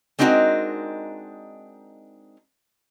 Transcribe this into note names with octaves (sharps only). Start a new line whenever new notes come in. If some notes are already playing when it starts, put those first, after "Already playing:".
G#3 C4 D4 D#4 F#4 A#4